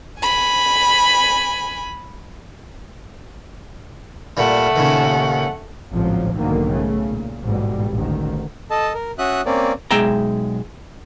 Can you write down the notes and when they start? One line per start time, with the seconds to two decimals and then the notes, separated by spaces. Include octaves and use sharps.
0.22 G#5 B5
4.37 A#2 G3 A3 F#5
4.76 D#2 A#2 C#3
5.91 A1 D2 G#2 C3 F3 F#3
6.34 B1 G#2 B2 D3 D#3 A#3
6.70 C#3 A3
7.09 A#2
7.44 A1 G#2 B2 G3
7.93 A1 D2 D#3
8.71 A4 D#5 A5
8.94 A#4
9.19 C#4 F#4 E5 D#6 F#6
9.46 A#3 C4 C#4 D5
9.91 B1 G#3 E5 G5 A#5